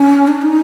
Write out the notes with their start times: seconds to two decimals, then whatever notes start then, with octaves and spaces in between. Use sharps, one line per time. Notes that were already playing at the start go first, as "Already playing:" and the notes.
Already playing: C#4
0.28 D4
0.42 D#4